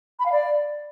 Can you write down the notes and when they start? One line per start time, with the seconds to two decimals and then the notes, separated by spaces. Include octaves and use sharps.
0.19 B5
0.25 F5
0.32 D5